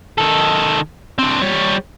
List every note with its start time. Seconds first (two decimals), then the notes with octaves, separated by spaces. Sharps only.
0.18 D#3 A4
1.18 C4 D4
1.41 G3 C#5